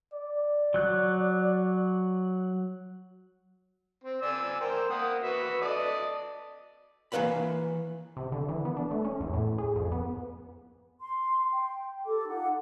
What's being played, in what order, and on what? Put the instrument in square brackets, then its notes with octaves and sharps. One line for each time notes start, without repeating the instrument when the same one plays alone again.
[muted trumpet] D5
[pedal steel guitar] F#3 F#6
[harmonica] C4
D5 G#5 E6
A#4 C5 G5
A#3 F#5 D#6
F#4 B4 E5
A4 D5 D#5
[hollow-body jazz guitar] E3 A#3 B4 F5 B5
[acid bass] C3
D3
E3
B3
D4
A3
C#4
E2
A2
G#4
F2
B3
[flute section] C6
G5
G4 A4 D6
D#4 F4 F#5